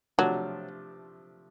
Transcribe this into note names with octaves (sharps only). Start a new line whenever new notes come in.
C3 F3 F#3 A3 D4